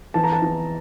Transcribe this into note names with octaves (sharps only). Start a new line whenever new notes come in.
E2 A5
A#5
A5
E2